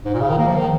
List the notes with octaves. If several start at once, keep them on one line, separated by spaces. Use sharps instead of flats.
G#2
A#2
C#3
D#3
A#3
F3
D#3